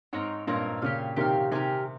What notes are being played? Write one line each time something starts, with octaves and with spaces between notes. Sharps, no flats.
G#2 C4 D#4 A#4 C#5
G2 A#2 C4 D#4 A#4 C#5
A#2 C#3 G4 C#5 F5
C3 D#3 G4 C#5 F5
C3 D#3 G4 A#4 C#5 G#5